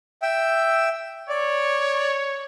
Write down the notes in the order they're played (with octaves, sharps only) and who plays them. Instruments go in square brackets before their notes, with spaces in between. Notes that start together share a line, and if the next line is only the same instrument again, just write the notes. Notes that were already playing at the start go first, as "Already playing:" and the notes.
[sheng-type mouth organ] E5 G5 E6
[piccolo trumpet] C#5 [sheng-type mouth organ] D5